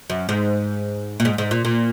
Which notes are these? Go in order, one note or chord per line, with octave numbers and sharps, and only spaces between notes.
F#2
G#2
A#2
G#2
G#2
A#2
A#2